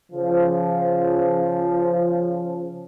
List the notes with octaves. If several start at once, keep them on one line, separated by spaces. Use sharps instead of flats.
C#3 F3